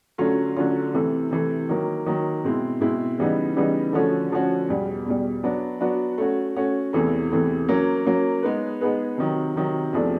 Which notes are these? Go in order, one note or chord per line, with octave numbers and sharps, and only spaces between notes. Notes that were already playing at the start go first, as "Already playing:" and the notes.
D3 F#3 A3 C#4 F4
D3 F#3 A3 C#4 F4
C3 E3 A3
C3 E3 A3
D#3 F#3 A#3
D#3 F#3 A#3
B2 G#3 C4 E4
B2 G#3 C4 E4
C#3 E3 G3 B3 D#4
C#3 E3 G3 B3 D#4
D3 F3 A3 C#4 F#4
D3 F3 A3 C#4 F#4
E2 B2 G3
E2 B2 G3
F#3 B3 D4 F#4
F#3 B3 D4 F#4
A3 C#4 F#4
A3 C#4 F#4
E2 C3 E3 A3
E2 C3 E3 A3
F#3 A#3 C#4
F#3 A#3 C#4
G#3 B3 D#4 G#4 B4
G#3 B3 D#4 G#4 B4
C3 D#3 F#3
C3 D#3 F#3
E2 C3 F3 A3 D4